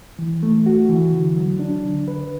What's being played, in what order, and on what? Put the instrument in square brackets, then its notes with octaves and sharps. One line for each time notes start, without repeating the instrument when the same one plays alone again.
[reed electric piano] E3
A3
F#4
E3
D3
F#3
D4
D3
B4